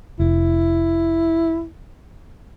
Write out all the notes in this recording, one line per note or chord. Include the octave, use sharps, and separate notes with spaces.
F1 E4